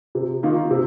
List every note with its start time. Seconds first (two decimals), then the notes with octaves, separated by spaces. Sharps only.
0.15 C3
0.43 D#3 A#3 F4
0.71 C3